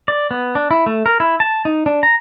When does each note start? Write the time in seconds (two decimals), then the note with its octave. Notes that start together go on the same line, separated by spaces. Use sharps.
0.08 D5
0.31 B3
0.55 D4
0.71 E4
0.86 A3
1.06 A#4
1.20 E4
1.40 A5
1.65 D#4
1.86 D4
2.03 A#5